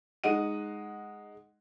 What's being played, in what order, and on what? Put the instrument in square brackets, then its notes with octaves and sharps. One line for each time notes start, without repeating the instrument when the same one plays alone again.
[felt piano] G#3 D#4 F#5 D#7